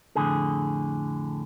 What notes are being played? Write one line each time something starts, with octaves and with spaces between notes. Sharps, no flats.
F2 A2 D3 G#4